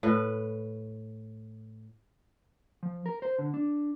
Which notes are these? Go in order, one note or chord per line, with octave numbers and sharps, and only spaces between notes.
A2 B4
F3
A#4
C5
D3
D4